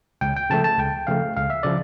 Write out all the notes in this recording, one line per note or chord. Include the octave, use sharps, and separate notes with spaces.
C#2 G5
G5
C#3 F3 A3 A5
A5
C#2 G5
C#3 F3 A3 F5
C#2 F5
E5
C#3 F3 D5